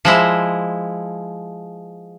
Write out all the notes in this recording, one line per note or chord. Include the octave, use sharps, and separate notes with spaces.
F3 G#3 E4